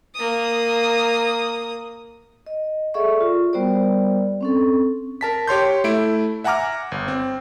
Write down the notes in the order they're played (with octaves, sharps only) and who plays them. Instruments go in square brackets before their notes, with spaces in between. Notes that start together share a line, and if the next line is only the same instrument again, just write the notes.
[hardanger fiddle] A#3 D#6
[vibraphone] D#5
G#4 A4 D5 E5 F#5 C#6
F4
G3 B3 F#4 A#4 C5 D5
C4 C#4 A4
[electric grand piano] A#4 A5 B6
G4 C#5 C6 G6
A3 E4 D7
E5 F#5 G#5 A#5 D6 F6
G1
C4